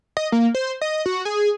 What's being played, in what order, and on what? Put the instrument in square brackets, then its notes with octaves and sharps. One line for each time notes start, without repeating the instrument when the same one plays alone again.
[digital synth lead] D#5
A#3
C5
D#5
F#4
G#4